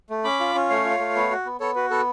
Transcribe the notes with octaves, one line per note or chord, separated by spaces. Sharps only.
A3
C#4 B5 D6
F4
C#4
A3 C#5 F5
F4
A3
B3
F#4
B3
B3 A4 C#5
F#4 B4
B3 A4